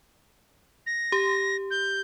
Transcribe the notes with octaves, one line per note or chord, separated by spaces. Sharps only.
A#6
G4
G6